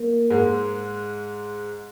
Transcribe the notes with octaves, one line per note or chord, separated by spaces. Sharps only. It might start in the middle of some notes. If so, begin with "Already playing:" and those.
Already playing: A#3
G#2 G#3